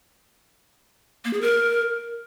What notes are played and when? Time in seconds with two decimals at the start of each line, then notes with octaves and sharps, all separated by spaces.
1.25 A#3
1.33 G#4
1.42 A#4